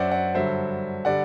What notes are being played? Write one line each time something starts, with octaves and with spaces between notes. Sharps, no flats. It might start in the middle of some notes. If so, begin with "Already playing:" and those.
Already playing: F#2 F#3 C5 D5 E5 F#5
D5 F#5
G2 D3 F#3 C5 E5
D3 G3 D5 F#5